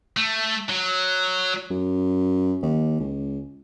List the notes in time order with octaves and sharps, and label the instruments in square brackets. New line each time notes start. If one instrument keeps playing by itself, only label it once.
[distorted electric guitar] A3
F#3
[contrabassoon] F#2
D#2
C#2